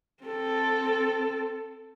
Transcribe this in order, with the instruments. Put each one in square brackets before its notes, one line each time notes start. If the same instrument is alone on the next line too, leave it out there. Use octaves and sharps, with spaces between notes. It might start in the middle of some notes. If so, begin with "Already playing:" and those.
[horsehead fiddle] C4 A4